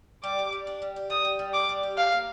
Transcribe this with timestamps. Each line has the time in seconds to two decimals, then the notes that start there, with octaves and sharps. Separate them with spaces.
0.23 G3 D6
0.39 G4
0.52 G3
0.67 D4
0.82 G3
0.96 G4
1.10 G3 D#6
1.25 G4
1.39 G3
1.54 D4 D6
1.69 G3
1.83 G4
1.97 A2 F5
2.12 A#3